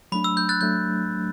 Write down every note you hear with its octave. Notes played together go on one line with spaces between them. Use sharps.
F#3 A3 D4 B5
E6
G6
F#6 A6
F#3 A3 D4 G6